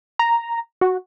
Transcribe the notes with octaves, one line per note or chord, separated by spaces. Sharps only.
A#5
F#4